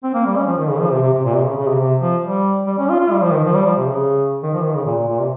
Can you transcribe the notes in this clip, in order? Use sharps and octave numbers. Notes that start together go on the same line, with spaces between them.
C4
A#3
G3
C#4
F3
D#3
C#3
F3
C3
C3
C3
A#2
C3
C#3
C#3
C3
C3
F3
G3
G3
C#4
F4
F4
G3
F3
D#3
F3
G3
F3
C3
C#3
D#3
F3
D#3
C#3
A#2
A#2
A#2
C3